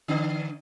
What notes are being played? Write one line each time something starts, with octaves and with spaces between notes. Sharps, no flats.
D3 D4